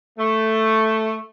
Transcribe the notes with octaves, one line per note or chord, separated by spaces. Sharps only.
A3